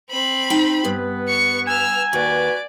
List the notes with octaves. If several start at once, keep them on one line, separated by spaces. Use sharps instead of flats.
C4 B5
D#4 G5
G2 B3 B4
C#6 C#7
G#5 E6 F6
D#2 F#4 B4 D5